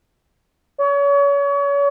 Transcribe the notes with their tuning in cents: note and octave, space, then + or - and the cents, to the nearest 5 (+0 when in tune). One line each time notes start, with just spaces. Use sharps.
C#5 +35